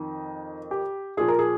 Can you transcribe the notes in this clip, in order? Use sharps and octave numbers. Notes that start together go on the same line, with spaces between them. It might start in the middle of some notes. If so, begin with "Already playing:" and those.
Already playing: F2 D#3 D#4
G4
A#2 F3 G#4
A#4
G#4